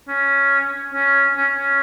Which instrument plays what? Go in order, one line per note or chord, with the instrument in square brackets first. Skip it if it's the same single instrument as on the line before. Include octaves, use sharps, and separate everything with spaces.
[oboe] C#4
C#4
C#4
C#4